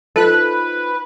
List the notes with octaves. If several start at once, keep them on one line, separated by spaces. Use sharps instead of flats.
D#4 F4 A4 B4 C5 F#6